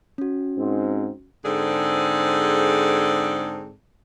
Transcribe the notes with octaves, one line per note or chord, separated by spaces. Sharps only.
C#4 F#4
G#2 C4
G#2 D3 C4 G#4 A4 D5